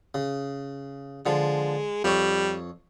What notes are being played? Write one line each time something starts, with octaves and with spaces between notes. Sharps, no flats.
C#3
D3 F3 G#3
F2 G3 C#5